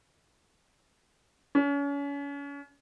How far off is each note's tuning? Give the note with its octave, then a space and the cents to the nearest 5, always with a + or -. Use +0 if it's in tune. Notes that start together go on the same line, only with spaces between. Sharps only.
C#4 +35